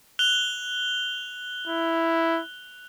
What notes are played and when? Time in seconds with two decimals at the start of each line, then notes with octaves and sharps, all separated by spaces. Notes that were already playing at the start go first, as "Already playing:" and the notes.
0.19 F#6 F7 G7
1.67 E4